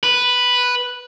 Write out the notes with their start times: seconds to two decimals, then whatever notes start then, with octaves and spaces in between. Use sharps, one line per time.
0.03 B4